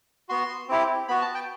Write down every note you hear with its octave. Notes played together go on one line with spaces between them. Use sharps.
B3 F#4 C6
C4 E4 G4
B3 F#4 B5
A5
G5